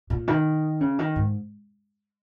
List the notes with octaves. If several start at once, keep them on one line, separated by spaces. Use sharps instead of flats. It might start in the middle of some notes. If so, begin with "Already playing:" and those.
A#2
D#3
C#3
D#3
G#2